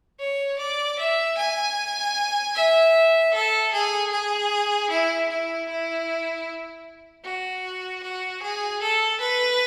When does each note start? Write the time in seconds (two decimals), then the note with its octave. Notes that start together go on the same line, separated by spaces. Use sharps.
0.20 C#5
0.59 D5
0.99 E5
1.38 G#5
2.55 E5
3.34 A4
3.72 G#4
4.12 G#4
4.90 E4
5.29 E4
5.69 E4
7.24 F#4
8.03 F#4
8.42 G#4
8.82 A4
9.21 B4